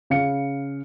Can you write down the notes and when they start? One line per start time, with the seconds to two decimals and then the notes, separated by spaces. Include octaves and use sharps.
0.10 C#3 F5 C#7